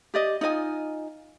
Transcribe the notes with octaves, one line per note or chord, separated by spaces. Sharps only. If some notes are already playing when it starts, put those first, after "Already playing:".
G4 D5 D#5
D#4 F4 D#5 G#5